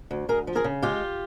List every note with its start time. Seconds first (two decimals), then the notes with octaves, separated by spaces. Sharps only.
0.11 D2
0.29 D2 G#4 A#4
0.47 F3
0.55 G#4 A#4
0.64 C#3
0.82 G#3 F4 G4